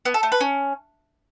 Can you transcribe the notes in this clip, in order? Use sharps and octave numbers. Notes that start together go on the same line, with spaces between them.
B3
A4
A3
B4
C#4